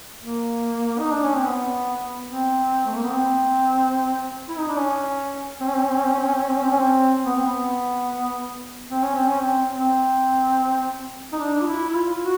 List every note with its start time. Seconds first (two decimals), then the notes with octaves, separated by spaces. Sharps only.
0.22 A#3
0.99 D#4
1.11 D4
1.23 C#4
1.34 C4
1.46 B3
2.29 C4
2.86 A3
2.95 A#3
3.03 B3
3.11 C4
4.49 E4
4.58 D#4
4.68 D4
4.77 C#4
5.60 C4
5.67 C#4
5.74 C4
5.82 C#4
5.89 C4
5.97 C#4
6.04 C4
6.12 C#4
6.19 C4
6.26 C#4
6.34 C4
6.41 C#4
6.48 C4
6.55 C#4
6.63 C4
6.71 C#4
6.78 C4
7.25 B3
7.36 C4
7.46 B3
8.91 C4
9.03 C#4
9.15 C4
9.27 C#4
9.40 C4
9.74 C4
11.33 D#4
11.39 D4
11.61 F4
11.67 E4
11.89 E4
11.95 F4
12.22 F#4